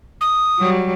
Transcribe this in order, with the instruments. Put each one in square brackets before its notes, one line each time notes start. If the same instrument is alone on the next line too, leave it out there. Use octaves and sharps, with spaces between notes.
[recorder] D#6
[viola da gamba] F#3 G3